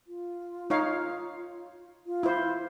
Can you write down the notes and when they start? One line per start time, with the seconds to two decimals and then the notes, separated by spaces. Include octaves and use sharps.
0.07 F4
0.70 D#4 C#5 F5
2.06 F4
2.23 E4 C5